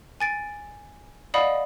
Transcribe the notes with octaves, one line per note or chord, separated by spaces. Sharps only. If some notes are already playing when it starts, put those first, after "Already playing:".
G#5 A6 D7
D5 D#5 F5 F#5 B5 D#6